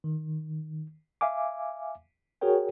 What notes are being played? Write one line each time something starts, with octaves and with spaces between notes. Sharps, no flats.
D#3
E5 F5 G#5 D6
F#4 G#4 A#4 C#5 G5